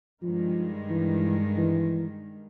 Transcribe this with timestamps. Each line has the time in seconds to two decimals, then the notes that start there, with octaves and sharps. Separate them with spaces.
0.22 G2 D#3 F3 G#3
0.90 E3
1.57 E3